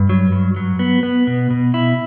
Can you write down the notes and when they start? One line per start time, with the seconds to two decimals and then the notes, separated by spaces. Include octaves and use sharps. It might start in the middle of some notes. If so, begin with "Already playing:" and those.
Already playing: G2
0.09 F#3
0.32 G2
0.56 F#3
0.79 B3
1.03 B3
1.27 B2
1.51 B2
1.74 E4